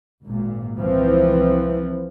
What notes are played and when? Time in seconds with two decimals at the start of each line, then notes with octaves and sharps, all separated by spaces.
0.23 G#1 A#2
0.78 C2 E3 F3 C4